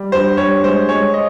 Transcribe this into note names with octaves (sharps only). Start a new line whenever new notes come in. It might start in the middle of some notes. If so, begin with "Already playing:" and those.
Already playing: G3
G2 C5
G2 C#5
G#3 C5
G#3 C#5
D#5